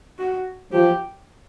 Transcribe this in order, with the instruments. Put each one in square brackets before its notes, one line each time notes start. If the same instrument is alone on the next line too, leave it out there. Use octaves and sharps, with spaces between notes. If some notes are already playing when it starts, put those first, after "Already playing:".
[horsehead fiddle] F#4
[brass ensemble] F3 [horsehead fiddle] G4